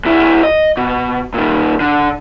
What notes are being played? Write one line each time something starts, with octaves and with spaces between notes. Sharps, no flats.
D2 E4
D#5
B2
A#2 D#3
D3